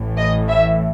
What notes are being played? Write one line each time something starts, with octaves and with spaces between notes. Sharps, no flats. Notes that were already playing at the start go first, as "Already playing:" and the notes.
Already playing: A1 A2 E3
D#5
E5